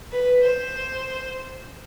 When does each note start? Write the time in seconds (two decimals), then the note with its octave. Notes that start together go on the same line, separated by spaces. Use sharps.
0.12 B4
0.43 C5